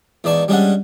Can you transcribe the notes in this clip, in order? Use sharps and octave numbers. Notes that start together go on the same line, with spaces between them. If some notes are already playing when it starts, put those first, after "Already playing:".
E2 G#2 D5 A5 C#6
G3 G#3 C#4 D4 F#5